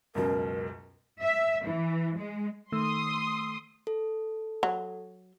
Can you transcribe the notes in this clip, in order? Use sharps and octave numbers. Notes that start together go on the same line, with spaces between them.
C#2 F#2 B2 A#4
E5
E3
G#3
D#3 A3 C6 D#6 E6
A4
F#3